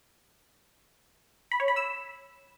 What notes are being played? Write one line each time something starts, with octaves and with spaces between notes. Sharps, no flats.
B5
C#5
B5
E6